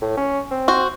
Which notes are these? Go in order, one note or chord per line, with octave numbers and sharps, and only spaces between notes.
A2
C#4
C4
F#4 C5